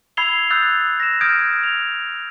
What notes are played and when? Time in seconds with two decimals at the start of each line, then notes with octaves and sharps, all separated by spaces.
0.17 B5 E6 G#6 C7 F7 G7
0.50 D#6 E6 F#6 G6 A6
1.00 A#6 E7
1.21 D#6 F6 G6 G#6 D7 E7
1.63 F7